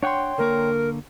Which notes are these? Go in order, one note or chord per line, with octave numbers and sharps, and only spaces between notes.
D4 C#5 F#5 G5 C6 C#6
D3 A#3 A#4 C#6